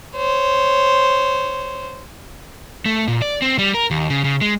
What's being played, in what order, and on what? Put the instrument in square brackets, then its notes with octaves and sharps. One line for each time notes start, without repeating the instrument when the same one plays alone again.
[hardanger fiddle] C5 C#5
[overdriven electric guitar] A3
A#2
D5
C4
G3
A#4
D#2
C#3
C#3
G#3